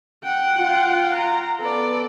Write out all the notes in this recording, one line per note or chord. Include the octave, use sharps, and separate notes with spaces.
F#5 G5
F4
A#5
B3 A4 B4 D5